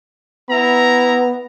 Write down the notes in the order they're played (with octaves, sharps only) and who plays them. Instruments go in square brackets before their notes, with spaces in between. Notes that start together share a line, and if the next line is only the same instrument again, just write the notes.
[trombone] B3 [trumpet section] E4 A#5